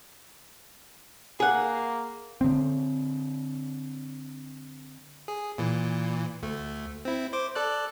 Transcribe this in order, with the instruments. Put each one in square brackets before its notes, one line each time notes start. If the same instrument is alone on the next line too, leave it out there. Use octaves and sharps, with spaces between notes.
[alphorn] A#3 [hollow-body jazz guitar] G#4 F#5
[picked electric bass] D3 C4
[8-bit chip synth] G#4
A#2 E3
D2 A3
C4 E4
C5 D6
A4 D5 F#6